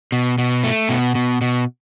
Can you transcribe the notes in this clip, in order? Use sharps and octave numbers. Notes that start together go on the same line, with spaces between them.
B2
B2
A3
B2
B2
B2